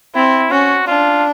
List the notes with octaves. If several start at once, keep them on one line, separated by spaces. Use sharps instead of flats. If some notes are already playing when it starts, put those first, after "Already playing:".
C4 E4
C#4 F#4
D4 F4